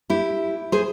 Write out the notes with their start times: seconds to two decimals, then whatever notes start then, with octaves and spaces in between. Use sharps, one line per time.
0.10 E4 G4
0.72 G#4 C5